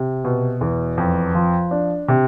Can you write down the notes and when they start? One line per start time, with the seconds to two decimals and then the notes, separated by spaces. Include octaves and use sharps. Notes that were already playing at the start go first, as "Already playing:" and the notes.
Already playing: C3
0.24 B2
0.61 E2
0.98 F2
1.35 F3
1.71 D4
2.08 C3